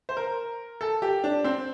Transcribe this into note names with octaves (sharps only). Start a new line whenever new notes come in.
C5
A#4
A4
G4
D4
C4